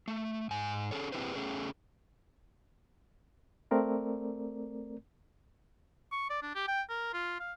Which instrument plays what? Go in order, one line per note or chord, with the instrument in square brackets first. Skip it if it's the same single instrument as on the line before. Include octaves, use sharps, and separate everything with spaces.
[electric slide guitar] A3
G#2 G#5
C#4 G#4 A4 C#5
C4 E4 G4 G#4 B4 C5
A3 C#4 G#4
[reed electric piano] A3 C4 A#4 D5
[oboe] C#6
D5
D4
G4
G5
A#4
F4
F5